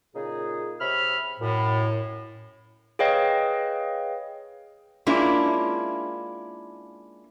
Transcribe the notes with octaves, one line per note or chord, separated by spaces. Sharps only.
A#2 C#3 D#4 G#4
C3 C#5 E5 B5 F6
F#2 A2
G#4 B4 C#5 D#5 F5 G5
G#3 A#3 C#4 D4 E4 F4